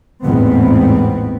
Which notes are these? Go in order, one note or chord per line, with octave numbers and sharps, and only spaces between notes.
A1 E2 G#2 B3 C4